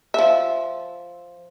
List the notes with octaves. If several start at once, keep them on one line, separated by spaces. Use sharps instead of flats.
F3 E5